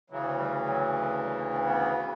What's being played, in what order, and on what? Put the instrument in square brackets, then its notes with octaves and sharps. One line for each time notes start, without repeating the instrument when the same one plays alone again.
[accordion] D2 C#3 E3 F#3
G3
F#3
G3
A#3
B3
B3